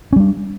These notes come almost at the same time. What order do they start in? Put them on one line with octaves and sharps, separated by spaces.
C#4 G3 D4